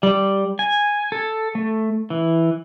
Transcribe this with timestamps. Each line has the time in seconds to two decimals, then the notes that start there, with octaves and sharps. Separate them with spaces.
0.03 G3
0.59 G#5
1.12 A4
1.55 A3
2.10 E3